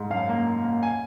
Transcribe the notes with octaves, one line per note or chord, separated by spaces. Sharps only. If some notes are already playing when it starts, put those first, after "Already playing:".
Already playing: G#2
F#2 F5
A#3
A#3
A#3
G#5